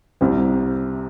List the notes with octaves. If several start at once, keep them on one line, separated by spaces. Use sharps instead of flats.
C2 C3 G3 C4